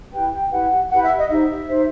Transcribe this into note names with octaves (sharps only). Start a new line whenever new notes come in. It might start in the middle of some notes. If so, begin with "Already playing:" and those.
E4 G4 B4 G5
G5
E4 G4 B4 F#5
E4 G4 B4 F#5
E5
D#5
D#4 G4 C5 E5
D#4 G4 C5